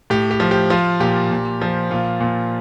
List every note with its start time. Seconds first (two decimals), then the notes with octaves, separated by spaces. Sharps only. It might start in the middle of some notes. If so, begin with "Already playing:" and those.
0.10 A2 G4
0.31 G4
0.40 F3
0.51 G4
0.70 F3 F4
1.00 A#2 G4
1.31 A#2
1.61 F3
1.91 A#2 F4
2.20 A#2